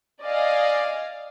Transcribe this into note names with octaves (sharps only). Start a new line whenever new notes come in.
D5 D#5 F5 G#5